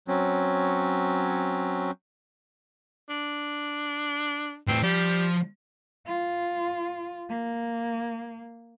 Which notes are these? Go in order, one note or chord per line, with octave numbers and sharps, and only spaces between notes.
F#3 C4 C#4
D4
A2 B3 C4
F3 G3
F4
A#3